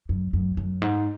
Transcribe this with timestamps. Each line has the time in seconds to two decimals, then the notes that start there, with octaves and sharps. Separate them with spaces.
0.09 F#2
0.33 F#2
0.57 F#2
0.82 G#2